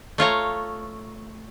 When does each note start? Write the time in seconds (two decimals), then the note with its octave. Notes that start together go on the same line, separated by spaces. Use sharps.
0.18 A3 F4 C#5 A#5